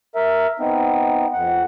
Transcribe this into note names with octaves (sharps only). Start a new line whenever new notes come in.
A#4 E5
B3 C4 D#4
F2 F#5